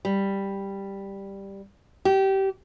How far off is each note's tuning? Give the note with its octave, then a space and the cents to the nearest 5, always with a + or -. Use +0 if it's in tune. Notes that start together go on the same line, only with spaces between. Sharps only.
G3 +5
G4 -20